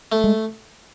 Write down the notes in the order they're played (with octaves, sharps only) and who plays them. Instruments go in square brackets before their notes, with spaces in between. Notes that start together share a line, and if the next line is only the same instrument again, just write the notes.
[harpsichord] A3
[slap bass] G#3